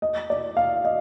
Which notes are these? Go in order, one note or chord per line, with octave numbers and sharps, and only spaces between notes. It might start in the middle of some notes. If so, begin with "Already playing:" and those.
D#5
D5
F5
D#5